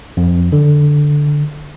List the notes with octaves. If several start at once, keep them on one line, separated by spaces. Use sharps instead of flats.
F2
D3